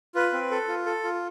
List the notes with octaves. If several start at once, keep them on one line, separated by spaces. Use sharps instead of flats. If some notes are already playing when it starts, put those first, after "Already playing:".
F4 B4
C4
A4
F4
A4
F4